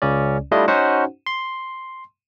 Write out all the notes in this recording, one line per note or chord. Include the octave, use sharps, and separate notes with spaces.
C#2 C#3 C#4 D5
G3 A3 D4 E4 F4 D#5
C#4 D#4 F#4 C5 F#5
C6